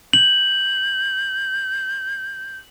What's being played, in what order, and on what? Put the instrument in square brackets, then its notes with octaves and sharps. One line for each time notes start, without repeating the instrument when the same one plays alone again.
[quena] G6 [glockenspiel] F#7